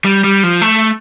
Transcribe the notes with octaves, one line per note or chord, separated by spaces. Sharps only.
G3
G3
F3
A3